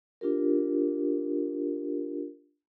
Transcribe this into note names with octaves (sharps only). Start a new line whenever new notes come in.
D4 F4 G4 A#4